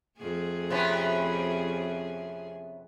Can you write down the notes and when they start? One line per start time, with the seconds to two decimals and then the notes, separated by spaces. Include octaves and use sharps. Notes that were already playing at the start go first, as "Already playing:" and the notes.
0.18 F2 A3 G#4
0.70 C3 B3 C#4